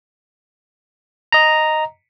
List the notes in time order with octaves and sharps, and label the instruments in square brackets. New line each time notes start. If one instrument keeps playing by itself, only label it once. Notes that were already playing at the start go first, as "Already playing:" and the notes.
[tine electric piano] D#5 A#5